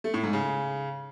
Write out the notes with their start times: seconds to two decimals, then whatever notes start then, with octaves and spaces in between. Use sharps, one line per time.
0.04 A3
0.14 A2
0.23 G#2
0.33 C#3